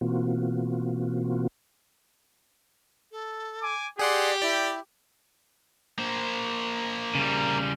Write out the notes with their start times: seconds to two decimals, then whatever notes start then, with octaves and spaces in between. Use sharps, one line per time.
0.01 B2 E3 A#3 C4 F4 F#4
3.12 A4
3.63 G#5 D6
3.99 G4 G#4 D5 F#5 C6
4.42 E4 D5
5.98 A#3 C5
7.15 C#3 G3